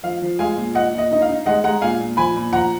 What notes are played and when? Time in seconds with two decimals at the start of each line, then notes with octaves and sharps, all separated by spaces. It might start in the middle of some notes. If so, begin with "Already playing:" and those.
0.03 F3 F5
0.22 F3
0.39 G#3 F5 G#5
0.57 A#2
0.75 A#2 D#5 F#5
0.93 A#2
0.98 D#5
1.11 D#4 D#5
1.22 F5
1.29 D#4
1.46 G#3 D#5 F#5
1.64 G#3 F#5 A#5
1.82 A#2 F5 G#5
2.00 A#2
2.17 F3 G#5 B5
2.36 A#2
2.53 F3 F#5 A#5